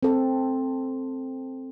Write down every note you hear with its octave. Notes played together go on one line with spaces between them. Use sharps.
C4 A4